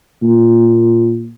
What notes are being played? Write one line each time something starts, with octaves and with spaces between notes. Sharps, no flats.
A#2